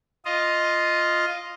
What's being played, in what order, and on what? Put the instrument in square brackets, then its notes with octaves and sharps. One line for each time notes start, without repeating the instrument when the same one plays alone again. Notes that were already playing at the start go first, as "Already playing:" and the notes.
[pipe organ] F4 D#5